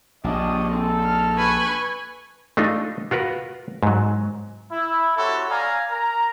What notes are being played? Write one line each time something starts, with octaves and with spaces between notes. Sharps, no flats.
A#1 D4 G4 C#5 D#5
C4 D#4 A4
F6
B4 G#5 B5 C#6
A3 D4 D#4 F4
F4 F#4 A#4 B4
G#2 F#3
E4
C4 E4 F#4 G4 A4 C#5
D5 F5 G#5 A#5
A#4 A#5